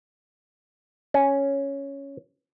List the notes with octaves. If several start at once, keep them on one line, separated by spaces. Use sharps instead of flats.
C#4